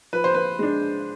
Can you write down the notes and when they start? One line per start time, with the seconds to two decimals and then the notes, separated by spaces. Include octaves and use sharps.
0.13 F3 B4
0.24 C5
0.34 B4
0.59 G#3 D4